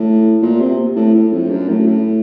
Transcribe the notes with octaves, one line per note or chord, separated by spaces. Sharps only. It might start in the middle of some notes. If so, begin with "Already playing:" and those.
Already playing: A2
A#2
C3
A2
A2
F2
F#2
A2
A2